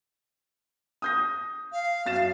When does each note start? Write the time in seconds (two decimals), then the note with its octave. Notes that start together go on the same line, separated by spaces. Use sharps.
1.02 D#6 G6 A#6
1.72 F5
2.06 F#2 A6 E7